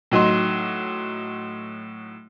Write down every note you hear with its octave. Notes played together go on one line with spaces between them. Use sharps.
A2 F#3 D#4 C6